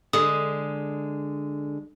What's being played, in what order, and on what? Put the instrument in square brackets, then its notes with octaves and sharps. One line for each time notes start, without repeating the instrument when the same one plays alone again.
[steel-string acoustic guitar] D3 G#3 [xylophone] D#6